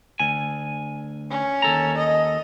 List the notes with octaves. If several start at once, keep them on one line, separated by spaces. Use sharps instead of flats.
D2 G#5
C#4
D#2 A4 A#5
D#5